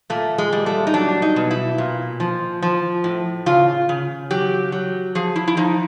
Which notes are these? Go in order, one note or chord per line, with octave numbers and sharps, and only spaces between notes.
A#2 A3
G#3
G3
A3
D#4
F#3 D4
D#4
B2
E4
A#2
F3
F3
A2
C#3 F4
C#3
F#3 G4
F#3
F3 G#4
E4
E4
F3 D#4